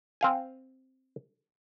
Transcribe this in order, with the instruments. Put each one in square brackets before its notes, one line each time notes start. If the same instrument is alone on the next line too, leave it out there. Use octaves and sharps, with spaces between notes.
[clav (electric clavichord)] C4 F5 G#5